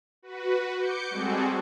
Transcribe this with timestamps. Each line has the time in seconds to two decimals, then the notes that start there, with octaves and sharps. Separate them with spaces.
0.22 F#4 B4
0.77 D6 G6 C#7
1.10 G3 G#3 C4 F#4 G#4 A4